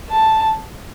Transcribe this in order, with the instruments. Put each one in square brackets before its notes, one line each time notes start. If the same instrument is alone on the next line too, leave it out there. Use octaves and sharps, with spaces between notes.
[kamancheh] A5